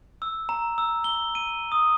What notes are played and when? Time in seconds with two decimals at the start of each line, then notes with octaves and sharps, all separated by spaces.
0.22 E6
0.49 A#5
0.78 E6
1.04 G7
1.35 D#7
1.72 D#6